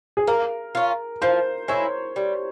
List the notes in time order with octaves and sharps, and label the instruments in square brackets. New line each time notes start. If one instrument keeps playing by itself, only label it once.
[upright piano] G#4
[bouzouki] A#3 [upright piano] A#4
[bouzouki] C#4 F4
[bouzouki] F3 [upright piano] C5
[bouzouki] G#3 E4 [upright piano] C#5
[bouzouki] G3